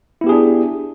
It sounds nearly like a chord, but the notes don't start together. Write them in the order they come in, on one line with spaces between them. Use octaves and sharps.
E4 B3 G4 G#4 D4